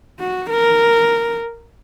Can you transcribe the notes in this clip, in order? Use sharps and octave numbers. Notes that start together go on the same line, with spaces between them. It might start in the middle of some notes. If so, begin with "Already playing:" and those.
F#4
A#4